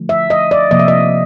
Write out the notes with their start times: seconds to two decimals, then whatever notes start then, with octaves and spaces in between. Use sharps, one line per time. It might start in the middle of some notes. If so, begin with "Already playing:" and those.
Already playing: D3 F3 A3
0.09 E5
0.30 D#5
0.51 D5
0.71 C3 F3 A#3 D#5
0.79 E5
0.88 D#5